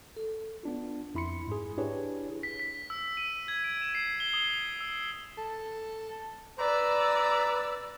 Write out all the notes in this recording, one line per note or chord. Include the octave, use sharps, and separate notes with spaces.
A4
B3 D4 F4
F2 E4 B5 C6 C#7
G#2 G#4
D4 E4 G4 G#4 B4 C#5
B6
B6
E6
D#7
G#6
D7
E7
C7
G7
D#6
E6
A4
B4 D5 A#5 E6